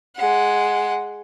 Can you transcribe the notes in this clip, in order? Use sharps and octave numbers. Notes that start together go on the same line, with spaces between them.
G#3 F#5